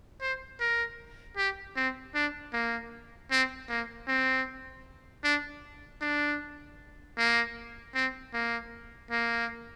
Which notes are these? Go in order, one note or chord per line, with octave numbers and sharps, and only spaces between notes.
C5
A#4
G4
C4
D4
A#3
C4
A#3
C4
D4
D4
A#3
C4
A#3
A#3